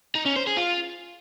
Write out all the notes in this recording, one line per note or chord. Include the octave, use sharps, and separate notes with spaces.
D#4
C#4
C5
G#4
F4